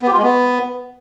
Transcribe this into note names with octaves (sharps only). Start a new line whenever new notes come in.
B3
G4
F4
G#3
B3